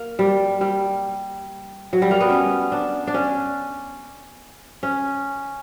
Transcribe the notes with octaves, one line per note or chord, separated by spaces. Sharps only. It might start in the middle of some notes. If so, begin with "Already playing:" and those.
Already playing: A#3
G3
G3
F#3
G3
A#3
B3
C#4
D4
D4
C#4
C#4